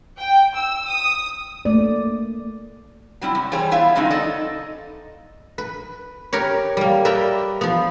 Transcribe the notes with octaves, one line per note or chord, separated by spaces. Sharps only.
G5
E6
D#6
A3 A#3 D5
F#3 G3 C4 E4
C3
E3 G3 G#4 C5 C#5
B3 E4 F4 E5 F5
C#3 F#3 G#3 C4 D#4
D#4 A4 D5 D#5
B4
G4 A#4 B4 C#5
G3 A#3
A#4 B4 D5 E5 G5 A#5
F3 B3